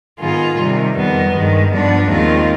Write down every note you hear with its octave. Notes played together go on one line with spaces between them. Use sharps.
G#2 D#3 B3 F4 G#4
C3 D#3 G3
F2 D#3 G3 B3
G2 D#3 G#3
G2 F3 B3 D4
D#2 D#3 G#3 C4 F4